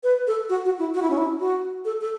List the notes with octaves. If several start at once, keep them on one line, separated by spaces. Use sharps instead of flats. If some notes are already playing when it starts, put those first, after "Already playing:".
B4
A4
F#4
F#4
E4
F#4
E4
C#4
E4
F#4
A4
A4